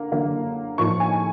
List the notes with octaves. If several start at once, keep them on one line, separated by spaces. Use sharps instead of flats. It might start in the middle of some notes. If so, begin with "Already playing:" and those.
Already playing: D3 A#3
D3 F#3 A#3
A2 F3 A#3 D#4 C#6
G#5